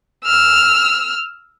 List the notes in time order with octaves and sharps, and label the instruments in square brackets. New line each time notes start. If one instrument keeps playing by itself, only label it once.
[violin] E6 F6